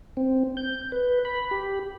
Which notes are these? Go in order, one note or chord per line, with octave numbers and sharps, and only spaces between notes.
C4
G6
B4
B5
G4